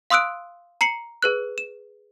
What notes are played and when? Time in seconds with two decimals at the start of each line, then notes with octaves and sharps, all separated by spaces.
0.10 F5 C6 D#6 E6 F#6 D7
0.81 A#5 C7 C#7 F#7
1.22 G#4 B4 F#6
1.58 E7